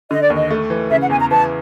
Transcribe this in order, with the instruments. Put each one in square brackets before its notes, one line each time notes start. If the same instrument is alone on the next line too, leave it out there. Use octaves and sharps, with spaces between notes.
[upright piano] D3 [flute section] D#5
[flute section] D5
[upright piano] D#2 [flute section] D#5
[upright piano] A3
E3
[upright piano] C#3 [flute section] E5
[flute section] F#5
[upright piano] E2 [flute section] G#5
[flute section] A#5
[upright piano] E3 [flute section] A5